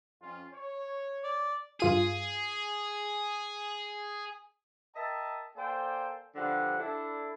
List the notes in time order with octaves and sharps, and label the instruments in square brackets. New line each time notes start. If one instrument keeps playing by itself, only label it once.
[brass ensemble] F2 C#4 F4
C#5
[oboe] D5
[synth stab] G2 F4 D#7 [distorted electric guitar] G#4
[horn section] A#4 D#5 E5 G5 A5
A#3 A4 C5 D5 G5 G#5
G2 D3 F3 G3 F#5
D4 E4 A4